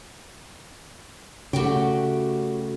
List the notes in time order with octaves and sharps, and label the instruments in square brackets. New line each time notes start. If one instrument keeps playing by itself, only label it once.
[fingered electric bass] C#3 A3 [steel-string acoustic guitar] F#4 G4 G5